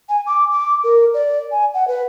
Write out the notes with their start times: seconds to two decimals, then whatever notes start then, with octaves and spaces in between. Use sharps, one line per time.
0.09 G#5
0.27 D6
0.52 D6
0.84 A#4
1.14 D5
1.51 G#5
1.74 F#5
1.88 B4